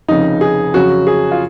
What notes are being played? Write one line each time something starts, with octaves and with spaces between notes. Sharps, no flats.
F1 F2 C#3 D#4
G#4
F2 C#3 F#3 F#4
G#4
F4